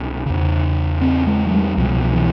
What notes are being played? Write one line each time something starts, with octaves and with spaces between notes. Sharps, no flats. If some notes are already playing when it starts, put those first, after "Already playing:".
Already playing: C2 B2 C#4
E2 C#3
C4
G#3
F#3
G3
C2 B2 F3
E3